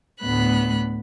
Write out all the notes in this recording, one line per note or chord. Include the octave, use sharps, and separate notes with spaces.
D2 A2 B3 B5 F#6